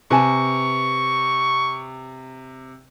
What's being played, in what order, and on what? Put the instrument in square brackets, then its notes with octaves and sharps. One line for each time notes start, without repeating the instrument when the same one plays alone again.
[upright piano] C3 [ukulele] B4 G#5 A5 [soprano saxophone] C#6